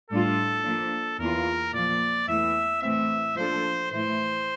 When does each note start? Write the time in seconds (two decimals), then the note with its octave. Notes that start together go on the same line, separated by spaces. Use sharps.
0.10 A2 G3 D4 F4 A4
0.64 F3 A#3 D4
1.19 E2 E3 A#3 F4 A#4
1.73 A#2 F3 A#3 D5
2.28 E2 E3 A3 E5
2.82 A2 E3 A3 C4 E5
3.37 F3 A#3 D4 A4 C5
3.90 A2 E3 A3 E4 C5